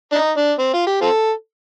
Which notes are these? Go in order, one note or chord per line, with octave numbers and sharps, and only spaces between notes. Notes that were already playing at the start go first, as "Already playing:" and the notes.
D4
D#4
D4
C4
F4
G4
C4 F4 A4